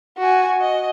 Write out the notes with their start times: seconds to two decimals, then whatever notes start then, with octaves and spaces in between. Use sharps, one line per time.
0.18 F#4 G#5
0.61 D#5